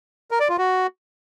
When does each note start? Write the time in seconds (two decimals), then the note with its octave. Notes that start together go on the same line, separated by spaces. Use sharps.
0.31 A#4
0.40 D5
0.49 F4
0.58 F#4